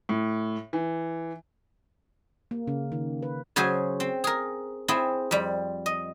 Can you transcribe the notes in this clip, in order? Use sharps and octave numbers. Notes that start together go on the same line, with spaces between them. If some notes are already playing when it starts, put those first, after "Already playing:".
A2
E3
A#3
C#3
D#3
B4
C#3 F#3 G#4 C5 G#5
C4
G#4 A#4
C4 E4 G#4
F2 G3
D#5